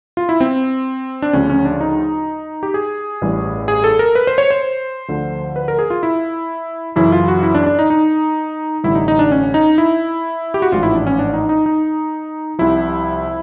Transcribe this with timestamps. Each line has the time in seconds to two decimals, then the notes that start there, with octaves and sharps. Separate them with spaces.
0.17 F4
0.29 E4
0.41 C4
1.22 D4
1.33 D2 C#3 F3 C#4
1.49 C#4
1.65 D4
1.81 D#4
2.63 G4
2.74 G#4
3.22 A1 G2 E3 G3
3.68 G#4
3.84 A4
3.99 A#4
4.15 B4
4.27 C5
4.38 C#5
4.51 C5
5.08 D2 D3 F3
5.56 B4
5.68 A#4
5.79 G#4
5.90 F4
6.03 E4
6.96 F#2 C#3 E3 E4
7.12 F4
7.28 F#4
7.43 E4
7.55 D4
7.66 D4
7.79 D#4
7.90 D#4
8.83 A1 G2 D3 G3 E4
8.95 D#4
9.08 D#4
9.19 D4
9.32 C#4
9.54 D#4
9.78 E4
10.54 G4
10.62 F#4
10.72 A1 G#2 F3 F4
10.83 E4
10.95 D4
11.07 C#4
11.19 D4
11.34 D#4
11.49 D#4
11.66 D#4
12.59 C2 C3 F3 E4